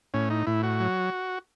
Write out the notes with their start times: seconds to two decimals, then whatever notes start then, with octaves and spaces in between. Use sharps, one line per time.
0.14 A2 C#4
0.30 D#4
0.47 A2 E4
0.63 F#4
0.80 F#3